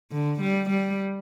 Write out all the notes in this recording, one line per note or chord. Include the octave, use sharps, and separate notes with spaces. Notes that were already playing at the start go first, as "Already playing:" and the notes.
D3
G3
G3